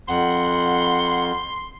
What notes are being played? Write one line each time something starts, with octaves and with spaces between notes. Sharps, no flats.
F2 F#5 C6